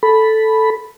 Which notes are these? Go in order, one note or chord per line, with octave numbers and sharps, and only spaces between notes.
A4 B5